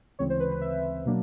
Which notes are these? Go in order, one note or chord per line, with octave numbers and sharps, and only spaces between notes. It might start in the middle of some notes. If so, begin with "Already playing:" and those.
D2 C#3 E3 G#3 C4 C#5
C5
B4
B4
E5
B2 F#3 A#3 D4